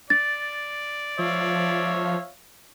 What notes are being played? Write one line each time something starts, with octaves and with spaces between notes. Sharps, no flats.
D5 A6
F3 C#5 E5 F5